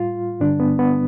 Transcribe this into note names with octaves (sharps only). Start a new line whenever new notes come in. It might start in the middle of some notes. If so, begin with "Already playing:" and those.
Already playing: A2 G3 F4
G2 D3 G3 D4
B3
B3